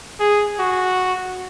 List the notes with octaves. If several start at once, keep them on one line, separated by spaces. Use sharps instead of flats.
G#4
F#4